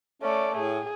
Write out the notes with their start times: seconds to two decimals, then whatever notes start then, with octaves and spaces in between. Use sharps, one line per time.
0.22 A3 C#4 D5
0.56 A2 G#4